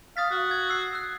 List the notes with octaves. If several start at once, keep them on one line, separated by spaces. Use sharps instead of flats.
F5 D#6 A6 B6
F#4
G#6
E6 C7
E6 F#6